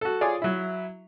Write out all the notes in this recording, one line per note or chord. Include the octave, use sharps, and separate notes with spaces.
F#4 A4
F4 G#4 C#5 D5
F#3 E4